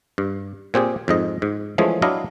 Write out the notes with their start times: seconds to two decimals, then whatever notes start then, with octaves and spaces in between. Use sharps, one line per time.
0.18 G2
0.74 A#2 C4 G4 G#4
1.08 F2 G#2 D#5
1.42 G#2
1.78 E3 F3 G#3 A3 C#4 G#4
2.02 F#3 D4 E4 D#5 F5